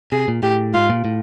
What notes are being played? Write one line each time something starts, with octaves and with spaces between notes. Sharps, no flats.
C3 G#4
A#2
A2 G4
G#2 F4
A#2
A2